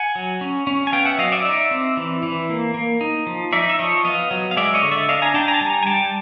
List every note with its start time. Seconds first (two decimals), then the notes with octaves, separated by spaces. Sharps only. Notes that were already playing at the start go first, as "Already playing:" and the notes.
Already playing: F#5 G#5
0.16 F#3
0.41 C#4
0.67 C#4
0.87 G#5
0.92 B3 F5 G5
1.05 E5 F#5
1.19 F#3 D#5 F5
1.32 D5 E5
1.45 D#4 D5 E5
1.71 C4
1.97 E3
2.23 E3
2.49 A#3
2.74 A#3
3.01 D#4
3.27 F3
3.53 D#4 D5 E5
3.70 E5
3.79 F3 C#5 D#5
4.04 B3 D#5 F5
4.31 F#3
4.51 F5
4.57 G#3 D5 E5
4.74 C#5 D#5
4.82 D3
4.92 D5 E5
5.09 D4 D#5 F5
5.22 G#5 A#5
5.34 D4 G5 A5
5.48 G#5 A#5
5.54 A5
5.61 G3 G#5 A#5
5.83 G#5
5.87 G3 G5 A5